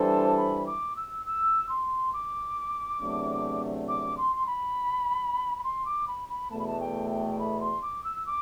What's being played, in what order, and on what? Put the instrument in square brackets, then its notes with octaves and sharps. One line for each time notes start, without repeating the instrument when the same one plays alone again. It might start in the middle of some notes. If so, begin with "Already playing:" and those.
Already playing: [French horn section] E3 G3 D4 A4 C5
[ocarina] A5
B5
D6
E6
E6
C6
D6
[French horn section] E2 C3 F#3 A3 D4
[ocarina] D6
C6
C6
B5
B5
C6
D6
B5
B5
[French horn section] E2 B2 A3 [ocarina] A5
[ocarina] B5
A5
G5
G5
B5
C6
D6
E6
D6